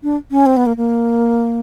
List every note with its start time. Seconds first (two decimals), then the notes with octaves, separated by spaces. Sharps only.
0.03 D4
0.31 C#4
0.46 C4
0.57 B3
0.66 A#3
0.77 A#3